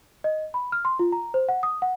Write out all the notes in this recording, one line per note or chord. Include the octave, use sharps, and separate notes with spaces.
D#5
B5
F6
C6
F4
A#5
C5
F#5
D#6
F#5